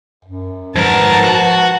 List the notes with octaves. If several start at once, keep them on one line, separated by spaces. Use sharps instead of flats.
F#2
G#2 F3 A#4 B4 F#5 A5
F#4